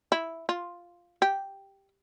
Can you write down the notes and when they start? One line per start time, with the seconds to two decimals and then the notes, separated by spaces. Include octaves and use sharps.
0.12 E4
0.49 F4
1.22 G4